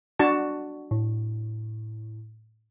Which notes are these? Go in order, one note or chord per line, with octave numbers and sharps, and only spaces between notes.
D4 F#4 A5
A2